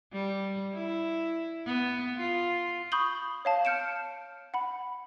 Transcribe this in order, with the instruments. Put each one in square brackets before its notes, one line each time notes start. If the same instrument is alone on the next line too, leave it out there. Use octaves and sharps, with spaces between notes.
[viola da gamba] G3
E4
B3
F4
[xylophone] B5 C#6 D#6 G6 F#7 G7
C#5 F5 A5
F6 G6 C#7 D7 E7
F#5 B5